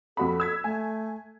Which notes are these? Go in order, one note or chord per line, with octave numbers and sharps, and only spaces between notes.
F2 F#4 A4 B5
E6 G#6 B6
A3 G#5